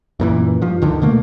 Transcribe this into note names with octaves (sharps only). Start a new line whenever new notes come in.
F#2 A#2 E3
G2 F3
D2 D3 D#3
B2 D3 A3 A#3